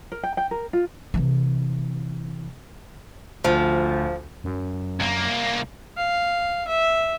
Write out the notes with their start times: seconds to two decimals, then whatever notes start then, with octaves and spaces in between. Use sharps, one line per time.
0.12 A#4
0.24 G5
0.37 G5
0.51 A#4
0.73 F4
1.14 C3 E3
3.44 D2 F3
4.44 F#2
5.00 C2 A#3
5.98 F5
6.68 E5